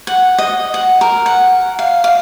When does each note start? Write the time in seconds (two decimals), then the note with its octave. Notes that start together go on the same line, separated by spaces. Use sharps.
0.07 F#5
0.38 D#5
0.74 F#5
1.01 A#4
1.26 F#5
1.79 F5
2.04 F5